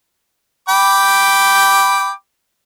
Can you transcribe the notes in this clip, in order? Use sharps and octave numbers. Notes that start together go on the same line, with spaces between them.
G5 B5 D6